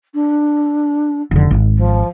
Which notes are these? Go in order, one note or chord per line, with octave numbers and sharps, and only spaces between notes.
D4
F1 D3
G#1
F3